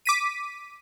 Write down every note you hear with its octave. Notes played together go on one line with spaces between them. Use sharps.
D6 B6 D#7